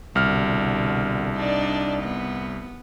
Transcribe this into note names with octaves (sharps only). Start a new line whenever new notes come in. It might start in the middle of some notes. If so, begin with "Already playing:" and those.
C2 B2 D3 F6
D4 D#4 D5
B3